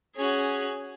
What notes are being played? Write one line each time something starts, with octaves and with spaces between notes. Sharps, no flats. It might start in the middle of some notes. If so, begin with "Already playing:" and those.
C#4 F#4 G#4